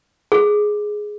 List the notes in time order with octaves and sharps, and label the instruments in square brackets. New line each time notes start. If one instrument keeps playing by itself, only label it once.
[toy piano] G#4